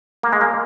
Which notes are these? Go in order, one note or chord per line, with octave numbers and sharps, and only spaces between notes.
A#3
G#3
A#3